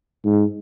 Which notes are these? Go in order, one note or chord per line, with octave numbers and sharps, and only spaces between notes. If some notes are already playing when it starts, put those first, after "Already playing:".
G#2